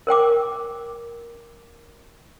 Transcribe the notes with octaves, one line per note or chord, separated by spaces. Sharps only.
A#4 C5 G5 D6